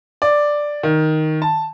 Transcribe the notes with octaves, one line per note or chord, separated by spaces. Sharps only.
D5
D#3
A5